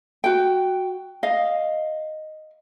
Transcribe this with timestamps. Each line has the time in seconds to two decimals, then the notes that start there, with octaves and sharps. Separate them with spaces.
0.24 F#4 G5
1.23 D#5 F5